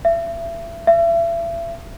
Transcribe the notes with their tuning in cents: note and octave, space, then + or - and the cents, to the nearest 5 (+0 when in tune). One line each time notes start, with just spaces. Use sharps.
E5 +30
E5 +35